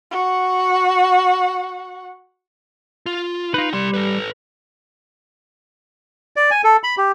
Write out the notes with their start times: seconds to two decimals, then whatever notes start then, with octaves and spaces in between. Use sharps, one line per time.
0.11 F#4 F#5
3.06 F4
3.54 D#4 F4 B4
3.73 G3 D5 C6
3.94 A4 B4
6.36 D5
6.51 G#5
6.64 A4
6.84 B5
6.98 G4